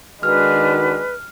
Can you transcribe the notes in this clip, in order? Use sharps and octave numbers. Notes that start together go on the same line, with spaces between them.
D#3 G#3 D4 F#4 B4 F6